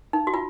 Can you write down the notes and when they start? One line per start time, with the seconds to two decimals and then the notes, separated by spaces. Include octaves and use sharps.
0.13 D#4
0.27 F#4
0.34 F4